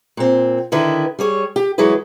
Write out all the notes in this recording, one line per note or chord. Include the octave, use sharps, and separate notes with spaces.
A#2 C4
D3 D#3 E4 B4
G3 G#4 C#5
G4
E3 F#3 G#3 E4 G#4 B4